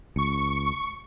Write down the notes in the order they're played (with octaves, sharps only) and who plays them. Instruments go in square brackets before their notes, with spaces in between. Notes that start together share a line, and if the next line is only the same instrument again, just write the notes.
[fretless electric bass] C#2 [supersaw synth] C#6 C#7